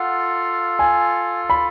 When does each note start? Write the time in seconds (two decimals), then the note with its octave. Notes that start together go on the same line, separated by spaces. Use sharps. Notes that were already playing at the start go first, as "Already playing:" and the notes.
Already playing: F4 A4 F5 F#5
0.79 G#5
1.50 B5